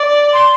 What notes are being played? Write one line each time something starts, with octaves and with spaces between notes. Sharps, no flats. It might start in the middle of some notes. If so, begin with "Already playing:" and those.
Already playing: D5
C6